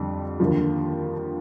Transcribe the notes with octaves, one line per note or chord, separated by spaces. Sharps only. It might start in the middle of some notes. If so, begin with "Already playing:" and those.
Already playing: F2 D3 G3
D#2 D3 F3